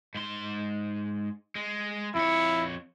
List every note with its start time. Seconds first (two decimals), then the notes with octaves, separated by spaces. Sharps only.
0.15 G#2 C6
1.55 G#3
2.15 F2 E4 C#5